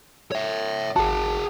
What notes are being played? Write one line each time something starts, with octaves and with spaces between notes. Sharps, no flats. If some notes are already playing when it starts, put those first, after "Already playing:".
C#5 E5
G#1 F#4 G#4 A5